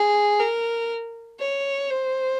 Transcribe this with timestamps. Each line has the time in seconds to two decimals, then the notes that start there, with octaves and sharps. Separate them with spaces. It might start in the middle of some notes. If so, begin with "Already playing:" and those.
Already playing: G#4
0.40 A#4
1.40 C#5
1.89 C5